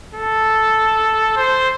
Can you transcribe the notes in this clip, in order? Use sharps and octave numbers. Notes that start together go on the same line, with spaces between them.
A4
C5